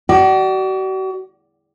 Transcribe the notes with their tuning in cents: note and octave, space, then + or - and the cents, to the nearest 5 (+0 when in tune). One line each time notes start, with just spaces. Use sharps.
F#4 +40 D5 +20